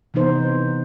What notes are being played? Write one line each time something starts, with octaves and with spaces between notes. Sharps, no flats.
C3 E3 B3 D#4 C5